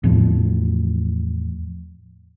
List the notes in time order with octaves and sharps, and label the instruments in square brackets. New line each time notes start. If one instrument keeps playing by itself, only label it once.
[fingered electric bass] E2 A2 F3